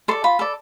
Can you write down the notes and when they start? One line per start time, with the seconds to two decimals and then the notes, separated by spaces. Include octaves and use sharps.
0.08 A4 C6
0.11 D5
0.24 F4 B5
0.39 A4 D5